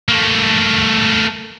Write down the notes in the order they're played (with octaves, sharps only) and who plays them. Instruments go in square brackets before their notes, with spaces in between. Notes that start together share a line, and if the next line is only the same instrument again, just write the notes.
[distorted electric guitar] A3 A#3